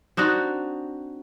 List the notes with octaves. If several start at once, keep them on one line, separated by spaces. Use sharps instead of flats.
C4 D4 D#4 F#4